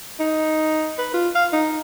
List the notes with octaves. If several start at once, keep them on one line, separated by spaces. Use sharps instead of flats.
D#4
B4
F4
F5
D#4